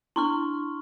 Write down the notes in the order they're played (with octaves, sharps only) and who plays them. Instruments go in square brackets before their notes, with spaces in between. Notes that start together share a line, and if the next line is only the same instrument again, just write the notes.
[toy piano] D4 E4 [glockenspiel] C6 C#6 F6